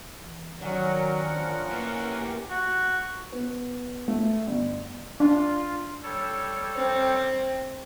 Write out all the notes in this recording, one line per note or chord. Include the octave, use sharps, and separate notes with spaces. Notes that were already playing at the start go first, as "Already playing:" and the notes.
E3
D#3 F#3 C#4 A#4 D5 F#5
A#1 F3
A#3 E4 B4
A2 G4
F#4
B3
A3
G1
D4 F4
G3 A4 C#5
C4